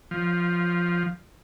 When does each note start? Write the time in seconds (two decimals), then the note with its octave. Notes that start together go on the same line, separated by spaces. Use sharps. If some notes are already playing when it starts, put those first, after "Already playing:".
0.11 F3